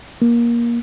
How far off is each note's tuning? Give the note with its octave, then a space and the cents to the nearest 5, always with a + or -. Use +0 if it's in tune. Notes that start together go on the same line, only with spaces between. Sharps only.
A#3 +20